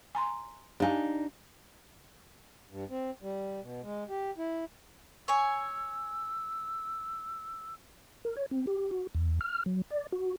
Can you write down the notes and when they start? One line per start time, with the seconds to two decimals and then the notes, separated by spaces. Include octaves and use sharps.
0.15 G#5 A#5 C6
0.80 D4 D#4 G4 F5 G#5
2.70 G2
2.90 C4
3.22 G3
3.61 B2
3.83 G#3
4.09 G4
4.38 E4
5.28 C#5 G#5 E6
8.25 A#4
8.37 C#5
8.51 C4
8.67 G4
8.91 F#4
9.15 E2
9.41 F6
9.66 F#3
9.91 D5
10.12 F#4